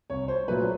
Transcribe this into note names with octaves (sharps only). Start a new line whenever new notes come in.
C2 C#5
C5
A#2 F#3 A3 B4